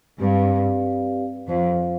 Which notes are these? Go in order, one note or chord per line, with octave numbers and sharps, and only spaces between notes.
G2 C4 G4 B4 D5 F5
F2 F4 C5 F5